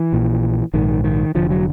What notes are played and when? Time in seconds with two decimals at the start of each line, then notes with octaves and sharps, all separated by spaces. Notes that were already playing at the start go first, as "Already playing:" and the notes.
Already playing: E3
0.13 A#1 A#2
0.74 A#1 G#2 D#3
1.04 D#3
1.35 F1 D#2 D3 F3
1.50 F#3